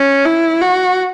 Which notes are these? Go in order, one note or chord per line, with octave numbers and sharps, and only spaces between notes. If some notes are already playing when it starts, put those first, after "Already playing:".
Already playing: C#4
E4
F#4